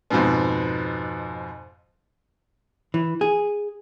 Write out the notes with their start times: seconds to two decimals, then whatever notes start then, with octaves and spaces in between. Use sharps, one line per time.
0.10 F2 G#2 B2
2.94 E3
3.21 G#4